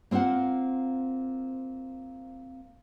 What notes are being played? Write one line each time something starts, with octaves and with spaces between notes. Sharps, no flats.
A#3 C4 F4 C5 F#5